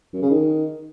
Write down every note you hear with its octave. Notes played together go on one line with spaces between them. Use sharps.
F#2
C#3
D#3